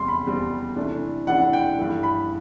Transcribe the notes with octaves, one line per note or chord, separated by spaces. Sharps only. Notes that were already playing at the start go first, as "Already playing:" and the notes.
Already playing: E2 C3 G3 C4 C6
B5
E2 C3 G3 C4
C3 E3 A3 D4
C3 E3 A3 D4 F#5
G5
G2 E3 A3
B5